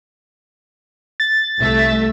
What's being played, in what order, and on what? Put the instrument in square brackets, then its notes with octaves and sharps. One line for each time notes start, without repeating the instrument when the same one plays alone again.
[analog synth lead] A6
[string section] C2 A3 E5